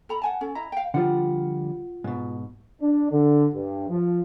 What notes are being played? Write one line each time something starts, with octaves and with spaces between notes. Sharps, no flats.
A4 A#5 B5
F#5 G#5 A5
C#4 A4
E4 D#5 A#5
F5 G5
D3 F3 G3 F4 F#5
G#2 B2
D4
D3
G2
F3